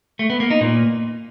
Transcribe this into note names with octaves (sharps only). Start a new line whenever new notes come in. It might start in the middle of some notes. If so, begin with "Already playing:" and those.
A3
B3
A#3
D#4
A#2